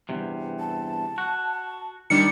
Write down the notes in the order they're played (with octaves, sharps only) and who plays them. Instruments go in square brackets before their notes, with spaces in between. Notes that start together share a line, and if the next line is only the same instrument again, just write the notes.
[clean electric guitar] E2 G2 C3
[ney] A5
[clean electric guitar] F#4
[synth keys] D#3 G3 D4 [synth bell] C#7